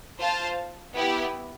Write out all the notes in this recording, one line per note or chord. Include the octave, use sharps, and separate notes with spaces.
F4 C5 F5 A5
B3 E4 G4